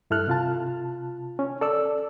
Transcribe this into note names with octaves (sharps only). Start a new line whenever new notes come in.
G2 E4 A4 F6 F#6
C3 F4 A5
C#4
A4 D5 E6